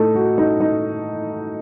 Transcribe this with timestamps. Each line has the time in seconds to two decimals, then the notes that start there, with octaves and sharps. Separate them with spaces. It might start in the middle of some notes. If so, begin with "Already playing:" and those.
Already playing: A2 A3 D#4 A4
0.15 F#4
0.38 D#4
0.60 D#4